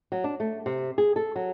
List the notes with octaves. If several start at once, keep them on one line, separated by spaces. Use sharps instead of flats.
F#3
D4
A3
C3
G#4
A4
F#3